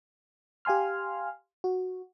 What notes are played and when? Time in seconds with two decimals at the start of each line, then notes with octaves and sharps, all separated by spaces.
0.65 G4 F5 G#5 C6 F6
1.64 F#4